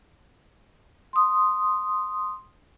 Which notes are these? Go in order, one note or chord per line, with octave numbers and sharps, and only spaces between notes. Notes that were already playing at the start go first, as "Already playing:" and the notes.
C6 D#6